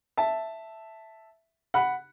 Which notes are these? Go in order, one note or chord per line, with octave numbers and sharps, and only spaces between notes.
E5 A5
F#5 B5